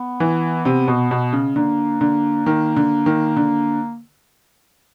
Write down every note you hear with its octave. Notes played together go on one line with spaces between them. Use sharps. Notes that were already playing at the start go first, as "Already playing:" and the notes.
Already playing: B3
E3
C3
B2
B2
C#3
D3 A#3
D3
D#3
D3
D#3
D3